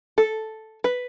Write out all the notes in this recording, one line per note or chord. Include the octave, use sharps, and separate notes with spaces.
A4
B4